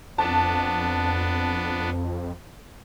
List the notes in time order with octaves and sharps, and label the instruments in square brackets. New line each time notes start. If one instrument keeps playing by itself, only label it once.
[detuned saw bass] F2 [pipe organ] B3 D4 [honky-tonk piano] A5